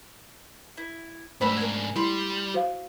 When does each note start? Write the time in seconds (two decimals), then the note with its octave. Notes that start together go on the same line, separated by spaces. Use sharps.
0.77 E4
1.41 G#2 A3 D4 A4 B4 C5 B5
1.57 G#3 A#4 G#5
1.96 G3 E4 B5 C6
2.54 F#4 C5 F5